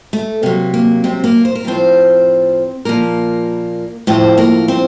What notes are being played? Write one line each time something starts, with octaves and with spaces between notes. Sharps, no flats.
A3
C3 F#3 A#3
A#3
C3 C4
A#3 A#4
C5
A#4
A2 F3 C4 C5
A#2 F3 A#3 A#4
A2 F3 C4 C5
A#3 A#4
C4 C5